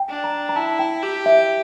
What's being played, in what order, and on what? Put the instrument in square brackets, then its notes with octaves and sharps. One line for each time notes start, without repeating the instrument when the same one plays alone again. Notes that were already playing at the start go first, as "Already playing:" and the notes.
Already playing: [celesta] G5
[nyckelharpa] D4
[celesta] A#5
A#5
[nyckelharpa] E4 [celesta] A5
[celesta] G5
[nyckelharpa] G4
[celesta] E5